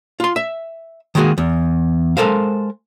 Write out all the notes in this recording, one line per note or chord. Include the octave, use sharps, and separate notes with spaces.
F4 C6
E5
D#3 G#3 A#3 B3 F#4 G#4
E2
G#3 A4 A#4 C5 F5